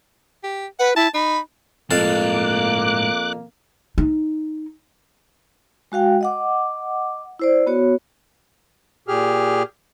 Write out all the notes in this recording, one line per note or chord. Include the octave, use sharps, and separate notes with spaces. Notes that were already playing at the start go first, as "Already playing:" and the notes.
G4
B4 F#5
E4 A5
D#4 B5
F2 A2 G#3 A#3 F5 A5 D6 F#6
D#4
G#3 F#4 F5 G5
D#5 F#5 D6
E4 C5 D5
B3 F#4 C#5
A#2 G4 G#4 F6